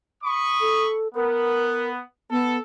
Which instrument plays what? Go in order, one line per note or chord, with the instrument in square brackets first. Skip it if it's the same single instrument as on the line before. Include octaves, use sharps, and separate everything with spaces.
[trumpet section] B5 C#6 D#6
[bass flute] A4
[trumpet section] B3 [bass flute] A#4
[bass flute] B3 [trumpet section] A4